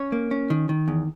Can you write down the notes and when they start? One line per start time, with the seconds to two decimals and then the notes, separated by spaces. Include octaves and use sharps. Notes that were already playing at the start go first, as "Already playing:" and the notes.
Already playing: C#4 C#5
0.12 A#3
0.31 C#4
0.50 D#3
0.69 D#3
0.88 E2